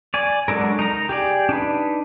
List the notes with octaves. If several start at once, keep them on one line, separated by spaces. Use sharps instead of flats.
D5 G#5
F#3 G#3 D4 A4 A#4
D#4 A#4 A#5
G4 G#4 D5
D4 D#4 B4